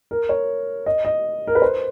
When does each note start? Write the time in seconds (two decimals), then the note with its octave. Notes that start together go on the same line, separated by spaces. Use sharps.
0.11 A#4
0.29 C#5
0.86 D#5
1.05 D#5
1.47 A#4
1.55 B4
1.62 C5